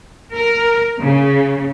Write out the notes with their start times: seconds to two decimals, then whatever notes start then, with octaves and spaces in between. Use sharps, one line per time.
0.34 A#4
1.01 C#3